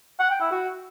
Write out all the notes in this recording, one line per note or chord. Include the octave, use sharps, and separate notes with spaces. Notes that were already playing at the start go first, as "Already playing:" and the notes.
F#5
G5
E4
F#4